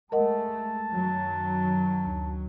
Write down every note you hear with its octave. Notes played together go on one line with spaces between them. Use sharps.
G#3 A3 A#4 D#5 F#5 A5
F#2 D#3 F#3
D2